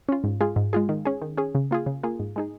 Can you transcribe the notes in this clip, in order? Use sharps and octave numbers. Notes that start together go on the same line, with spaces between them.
C#4 F4
G#2
G#3 F4 G#4
G#2
G#3 F4 G#4
D#3
C#4 G#4
D#3
C#4 G#4
C#3
A#3 F4 G#4
C#3
A#3 F4 G#4
G#2
G#3 D#4 G#4